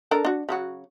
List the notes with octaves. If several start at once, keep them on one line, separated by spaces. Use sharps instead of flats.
D4 A4 A#4
D4 F#4
C#3 F#3 F#4